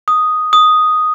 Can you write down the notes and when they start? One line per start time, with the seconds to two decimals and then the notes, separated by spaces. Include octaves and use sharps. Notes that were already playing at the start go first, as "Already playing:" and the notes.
0.08 D#6
0.53 D#6